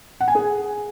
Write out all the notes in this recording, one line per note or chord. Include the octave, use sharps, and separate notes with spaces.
F#5
G#5
G#4